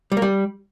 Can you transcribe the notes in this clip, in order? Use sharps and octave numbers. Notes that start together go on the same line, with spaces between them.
G3
A#3
G3